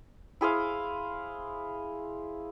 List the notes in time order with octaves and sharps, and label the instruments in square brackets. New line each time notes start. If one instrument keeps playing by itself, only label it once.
[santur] E4 G#4 C5 F5